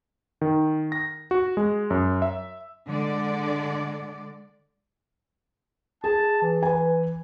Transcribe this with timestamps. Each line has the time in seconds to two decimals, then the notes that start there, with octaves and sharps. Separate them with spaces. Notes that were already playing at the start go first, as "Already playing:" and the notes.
0.41 D#3
0.92 A#6
1.31 F#4
1.57 G#3
1.90 F#2
2.22 E5
2.87 D3 G#3 D5
6.04 G#4 A5
6.42 E3
6.63 B4 G#5